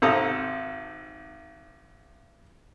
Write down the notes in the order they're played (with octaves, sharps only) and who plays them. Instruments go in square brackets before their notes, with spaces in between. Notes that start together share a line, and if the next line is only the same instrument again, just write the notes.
[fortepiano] G#1 C3 A4 A#5 D#6